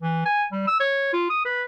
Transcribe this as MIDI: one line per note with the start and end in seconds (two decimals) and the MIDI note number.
0.02 0.22 52
0.25 0.44 80
0.52 0.67 55
0.67 0.76 88
0.80 1.08 73
1.13 1.29 65
1.30 1.41 87
1.45 1.64 71